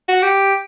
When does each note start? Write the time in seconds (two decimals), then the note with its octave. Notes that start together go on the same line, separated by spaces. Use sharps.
0.08 F#4
0.22 G4